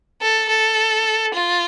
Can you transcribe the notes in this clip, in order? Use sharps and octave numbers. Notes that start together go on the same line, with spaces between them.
A4
A4
F4